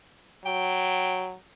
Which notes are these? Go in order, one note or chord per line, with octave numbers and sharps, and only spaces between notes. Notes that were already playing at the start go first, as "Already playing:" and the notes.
F#3 G5